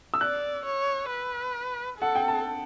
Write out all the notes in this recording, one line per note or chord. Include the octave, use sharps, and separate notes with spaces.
E6
D5 F#6
C#5
B4
A4 F#5
G5
A5